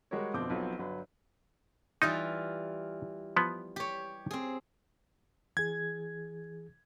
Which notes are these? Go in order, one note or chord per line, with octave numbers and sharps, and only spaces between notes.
G3 G#3 F#4 G4 A#4 C#5
G1 F2 B2 C4 D6 G6
B1 F3 F#3 B3 C4 C#5
G1 F#3 B4
E3 G3 D#4 F4
F3 B3
G4 C#5
C4 G#4
E3 G#4 G#6